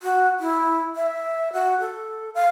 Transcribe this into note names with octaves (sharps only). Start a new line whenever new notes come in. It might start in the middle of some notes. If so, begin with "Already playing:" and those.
F#4
E4
E5
F#4
A4
F5